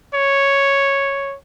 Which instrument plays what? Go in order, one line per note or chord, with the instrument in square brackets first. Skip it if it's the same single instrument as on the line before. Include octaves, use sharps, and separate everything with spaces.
[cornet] C#5